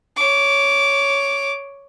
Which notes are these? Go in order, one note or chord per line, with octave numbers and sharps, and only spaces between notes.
C#5 D6